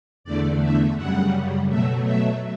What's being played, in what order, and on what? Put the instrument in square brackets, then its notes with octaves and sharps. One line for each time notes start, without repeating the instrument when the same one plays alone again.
[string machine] E2 D3 A3 D5
E5
F#2 C#3 G3 F#5
B2 F#3 A3 E5
E5